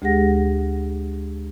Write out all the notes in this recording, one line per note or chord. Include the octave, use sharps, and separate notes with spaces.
D2 G#3 G4 G#4 F#5 A#6